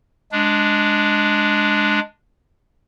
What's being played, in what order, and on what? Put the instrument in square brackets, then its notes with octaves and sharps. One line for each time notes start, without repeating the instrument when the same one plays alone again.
[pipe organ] G#3 D4